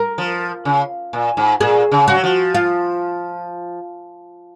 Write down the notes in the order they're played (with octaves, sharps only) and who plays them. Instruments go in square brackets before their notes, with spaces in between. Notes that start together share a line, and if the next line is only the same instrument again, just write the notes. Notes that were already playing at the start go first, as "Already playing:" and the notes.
Already playing: [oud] A#4
[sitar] F3
C#3
A#2
G#2
[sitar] A#2 [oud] G#4
[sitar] C#3
[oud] F#4
[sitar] F#3
F3
[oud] F4